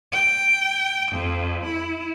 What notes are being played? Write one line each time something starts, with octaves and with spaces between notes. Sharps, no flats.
G5
F2
E4